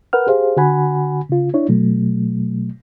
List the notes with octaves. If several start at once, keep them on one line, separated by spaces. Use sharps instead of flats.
A#4 B4 F#5 F6
G4 G#4 C5 F5
D3 F#4 F#5 G#5 B5
C#3 F4
D4 E4 C#5
B2 F#3 A3